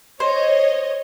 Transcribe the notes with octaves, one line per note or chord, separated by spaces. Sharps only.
C5 C#5 D#5